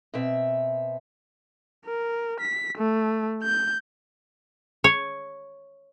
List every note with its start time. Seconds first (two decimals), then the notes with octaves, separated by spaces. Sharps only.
0.14 B2 C4 E5
1.86 A#4
2.40 B6
2.78 A3
3.44 G6
4.84 C#5